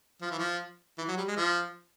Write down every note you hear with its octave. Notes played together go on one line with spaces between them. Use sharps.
F3
E3
F3
E3
F#3
G3
G#3
F3